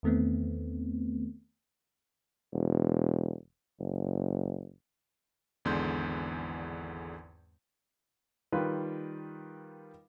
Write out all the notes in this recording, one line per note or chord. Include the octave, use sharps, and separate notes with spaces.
E2 D#3 A3 B3 C4
E1
F#1
G#1 E2 D3 G#3 C6 G6
D#3 G3 F4 B4